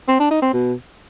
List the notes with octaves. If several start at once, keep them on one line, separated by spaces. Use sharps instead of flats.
C4
D4
D#4
C4
B2